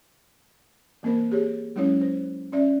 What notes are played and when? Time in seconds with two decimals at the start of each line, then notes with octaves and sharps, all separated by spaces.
1.03 E3 A#3 C4 A#4 C5
1.32 G4 G#4 C#5
1.76 F#3 G#3 C#4 E4 C#5
2.01 C5
2.52 C#4 D5 E5